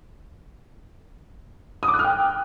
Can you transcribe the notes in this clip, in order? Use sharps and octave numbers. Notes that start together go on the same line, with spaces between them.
D#6
D6
F#6
F6
G5